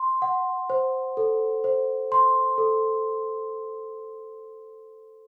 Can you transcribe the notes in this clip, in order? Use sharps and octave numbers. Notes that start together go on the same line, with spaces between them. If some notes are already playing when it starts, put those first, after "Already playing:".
Already playing: C6
F#5
C5
A4
C5
C6
A4